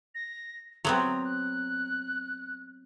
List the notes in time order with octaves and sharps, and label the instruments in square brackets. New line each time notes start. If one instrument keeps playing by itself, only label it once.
[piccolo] A#6
[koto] F#3 B3 C4 [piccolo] A#5
[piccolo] F#6